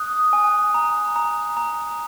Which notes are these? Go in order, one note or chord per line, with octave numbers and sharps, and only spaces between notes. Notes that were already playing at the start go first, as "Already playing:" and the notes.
Already playing: D#6 F#6
G#5
A#5
A#5
A#5